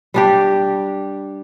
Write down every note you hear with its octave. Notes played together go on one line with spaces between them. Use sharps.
G3 D4 G4